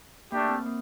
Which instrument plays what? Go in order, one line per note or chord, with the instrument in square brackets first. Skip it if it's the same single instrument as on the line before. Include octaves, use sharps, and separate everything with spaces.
[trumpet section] A3 D4 G4 [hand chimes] A#3
[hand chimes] C4
A#3